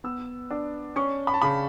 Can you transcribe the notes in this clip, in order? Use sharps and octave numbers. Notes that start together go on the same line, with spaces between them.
B3 E6
D4
C#4 C#6
B5
A5
C#3 B5